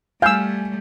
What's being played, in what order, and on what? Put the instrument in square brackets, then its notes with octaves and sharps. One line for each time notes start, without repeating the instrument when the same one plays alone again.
[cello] G3 A3 [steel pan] F5 E6 [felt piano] G#5 G6